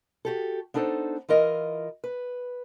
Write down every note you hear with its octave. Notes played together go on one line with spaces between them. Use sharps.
F#4 G4 A4
B3 D4 D#4 A4 C5
E3 F4 A#4 D#5
B4